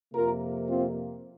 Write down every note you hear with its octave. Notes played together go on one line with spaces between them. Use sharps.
F2 C3 A#3 F4 A#4
C4 F4